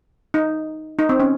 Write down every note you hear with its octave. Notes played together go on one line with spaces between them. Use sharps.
D#4
D#4
C4
C#4